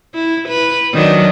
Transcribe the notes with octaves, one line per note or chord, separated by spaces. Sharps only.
E4
B4
D#3 F#3 D4